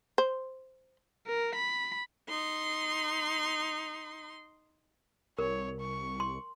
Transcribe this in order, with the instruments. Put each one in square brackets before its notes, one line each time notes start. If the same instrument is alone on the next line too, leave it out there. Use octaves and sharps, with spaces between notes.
[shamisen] C5
[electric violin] A#4
B5
[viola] D#4 C6
[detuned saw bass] C2 [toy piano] A#4 [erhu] C#5
[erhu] C#6
[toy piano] C6